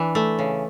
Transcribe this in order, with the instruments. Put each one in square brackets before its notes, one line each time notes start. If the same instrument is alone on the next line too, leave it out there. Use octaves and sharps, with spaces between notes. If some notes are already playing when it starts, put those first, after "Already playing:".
Already playing: [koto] E3 D4
A3
C#3